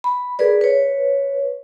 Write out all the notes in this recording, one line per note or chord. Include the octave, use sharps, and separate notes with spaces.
B5
G#4 A#4 B4 D5
B4 C#5